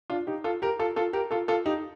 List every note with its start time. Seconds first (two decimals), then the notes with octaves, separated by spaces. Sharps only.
0.10 D4 F4
0.27 D#4 G4
0.44 F4 A4
0.62 G4 A#4
0.79 F4 A4
0.96 F4 A4
1.13 G4 A#4
1.31 F4 A4
1.48 F4 A4
1.66 D#4 G4